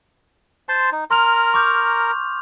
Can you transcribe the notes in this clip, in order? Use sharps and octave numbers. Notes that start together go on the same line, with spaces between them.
C5 A5 C6
D#4
A#4 A#5 C6 F6 F7
C#6 D6 G6